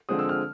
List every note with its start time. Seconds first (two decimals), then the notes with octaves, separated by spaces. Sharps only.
0.09 D3 F3 G#3 C4 D#6
0.19 E6
0.29 F6